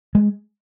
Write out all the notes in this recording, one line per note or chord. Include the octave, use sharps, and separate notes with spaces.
G#3